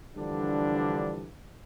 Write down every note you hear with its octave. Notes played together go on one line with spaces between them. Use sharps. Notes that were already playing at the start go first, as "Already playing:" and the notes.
D3 E3 F3 G3 D4